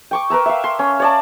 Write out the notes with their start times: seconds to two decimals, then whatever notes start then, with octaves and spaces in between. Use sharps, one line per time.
0.11 G5 C#6 D6
0.30 A#4 B4 A#5 E6
0.46 E5 F5
0.64 C6
0.79 C#4
1.00 C#5 D5 A5